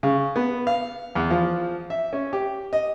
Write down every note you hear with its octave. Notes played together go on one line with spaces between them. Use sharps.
C#3
B3
F5
E2
F3
E5
C#4
G4
D#5